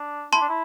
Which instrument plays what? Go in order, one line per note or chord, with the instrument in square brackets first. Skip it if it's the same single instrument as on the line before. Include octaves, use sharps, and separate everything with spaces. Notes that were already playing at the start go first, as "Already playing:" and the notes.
Already playing: [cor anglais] D4
[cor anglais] E4 [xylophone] A5 C6
[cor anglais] D4
E4